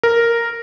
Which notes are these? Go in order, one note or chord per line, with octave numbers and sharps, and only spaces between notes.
A#4